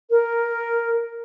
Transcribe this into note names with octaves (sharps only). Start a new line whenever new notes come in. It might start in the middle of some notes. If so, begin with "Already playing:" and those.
A#4